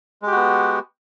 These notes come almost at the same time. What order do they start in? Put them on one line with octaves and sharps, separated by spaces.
G#3 G4 F#4 B3